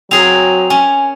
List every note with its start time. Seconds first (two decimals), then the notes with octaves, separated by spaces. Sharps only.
0.11 F#3 C4 G#4 A#4 F7
0.70 C#4 G#5